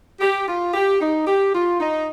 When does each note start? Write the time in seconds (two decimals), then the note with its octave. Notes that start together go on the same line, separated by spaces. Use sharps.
0.19 G4
0.47 F4
0.74 G4
1.00 D#4
1.26 G4
1.53 F4
1.80 D#4